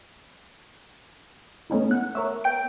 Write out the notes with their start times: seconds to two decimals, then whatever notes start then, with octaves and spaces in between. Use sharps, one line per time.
1.70 A3 B3 C#4 D#4 E4
1.91 F#5
2.15 A#4 C#5 E5
2.44 B3 G5 D7